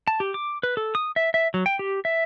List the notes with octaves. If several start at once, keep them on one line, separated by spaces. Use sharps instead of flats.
A5
G4
D6
B4
A4
D#6
E5
E5
F#3
G5
G4
E5